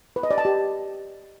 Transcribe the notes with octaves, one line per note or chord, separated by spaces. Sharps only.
B4
D#5
D5
A5
G4